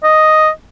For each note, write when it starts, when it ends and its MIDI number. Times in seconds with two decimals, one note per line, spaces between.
0.03 0.49 75